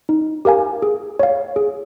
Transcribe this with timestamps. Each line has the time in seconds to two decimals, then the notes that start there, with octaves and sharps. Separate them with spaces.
0.09 D#4
0.45 G4 A#4 F5 G#5
0.82 G#4
1.19 C#5 F5
1.56 G#4